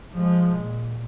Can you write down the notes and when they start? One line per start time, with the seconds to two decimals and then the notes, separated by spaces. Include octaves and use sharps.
0.14 F3 G#3
0.57 A#2